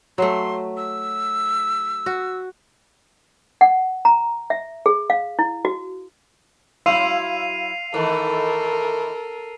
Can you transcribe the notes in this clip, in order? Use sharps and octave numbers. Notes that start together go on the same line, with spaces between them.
F#3 A3 C6
E6
F#4
F#5
A#5
E5
G#4
F5
E4
F#4
F#3 E4 F5 C6 E6 C7 D#7 F7
D#3 E3 A3 A4 A#4